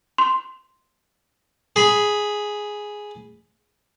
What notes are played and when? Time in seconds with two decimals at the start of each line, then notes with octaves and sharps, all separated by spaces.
0.18 C6
1.76 G#4 B5